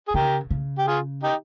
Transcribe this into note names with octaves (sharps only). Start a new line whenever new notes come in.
G#4
C#3 G4 A#4
C#3
G4
F4 G#4
D#4 G4